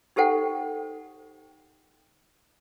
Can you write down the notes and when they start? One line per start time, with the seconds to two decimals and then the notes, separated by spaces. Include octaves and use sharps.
0.16 D#4 G4 A4 C5 F#5 G5